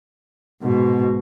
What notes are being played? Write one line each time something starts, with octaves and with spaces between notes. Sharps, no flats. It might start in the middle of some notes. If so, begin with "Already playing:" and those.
G#2 B2